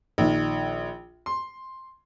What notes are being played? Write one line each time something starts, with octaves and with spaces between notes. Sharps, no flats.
A#1 D#3
C6